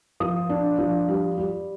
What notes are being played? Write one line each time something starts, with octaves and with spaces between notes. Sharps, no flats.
F3 D#6
D4
F3
G3
G3